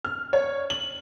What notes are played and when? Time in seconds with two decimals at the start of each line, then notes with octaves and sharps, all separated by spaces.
0.05 F6
0.33 C#5
0.70 F#7